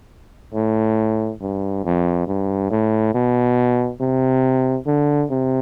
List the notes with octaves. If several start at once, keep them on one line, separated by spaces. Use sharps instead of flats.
A2
G2
F2
G2
A2
B2
C3
D3
C3